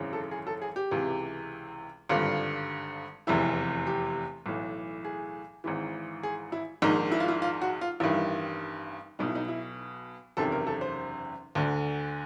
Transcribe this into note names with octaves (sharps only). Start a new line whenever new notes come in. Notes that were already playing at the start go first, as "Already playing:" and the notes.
Already playing: G#1 F#2 C#3 E3
A4
G#4
A4
G#4
G4
C#2 C3 E3
G#1 G2 D3 F4
F1 E2 C3 E3 E4
G4
B1 A2 E3
G#4
G#1 G#2 E3
G#4
E4
A#1 G#2 D#3 D#4
E4
F4
E4
F4
F#4
F4
A1 G2 D#3 E4
B1 B2 D#4
E4
D#4
E4
F#1 E2 C3 D#3 A4
A#4
A4
C5
D2 D3